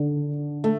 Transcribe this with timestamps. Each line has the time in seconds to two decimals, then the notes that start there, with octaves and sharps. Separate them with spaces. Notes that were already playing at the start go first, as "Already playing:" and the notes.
Already playing: D3 D4
0.64 A3